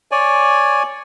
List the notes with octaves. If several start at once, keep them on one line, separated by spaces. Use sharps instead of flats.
C#5 D5 G#5